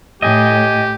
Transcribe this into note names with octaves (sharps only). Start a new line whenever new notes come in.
A2 G4 D#5 G#5